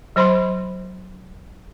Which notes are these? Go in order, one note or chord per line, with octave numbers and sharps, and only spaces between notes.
F#3 C5 B5 C6